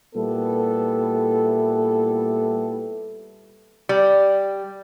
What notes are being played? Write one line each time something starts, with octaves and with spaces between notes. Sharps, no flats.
A#2 G3 B3 E4 G4 A4
G3